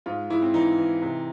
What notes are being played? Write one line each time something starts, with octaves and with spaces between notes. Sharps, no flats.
G#2 F4
G#2 E4
C4
E3 D#4
E3
C3